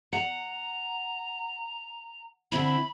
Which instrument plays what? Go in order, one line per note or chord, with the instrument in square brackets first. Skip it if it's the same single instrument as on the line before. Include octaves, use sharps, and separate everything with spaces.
[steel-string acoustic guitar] F#5 [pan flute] A#5
[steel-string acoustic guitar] D3 C4 E4 [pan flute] B5